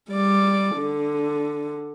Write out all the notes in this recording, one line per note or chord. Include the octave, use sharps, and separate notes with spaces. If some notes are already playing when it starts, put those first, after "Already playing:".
G3 D5
D3